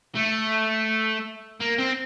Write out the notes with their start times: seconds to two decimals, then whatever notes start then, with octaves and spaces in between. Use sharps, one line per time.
0.15 A3
1.60 A#3
1.78 C4